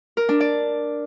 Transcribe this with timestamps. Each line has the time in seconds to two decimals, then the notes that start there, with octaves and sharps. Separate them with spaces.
0.17 A#4
0.29 D4
0.40 D5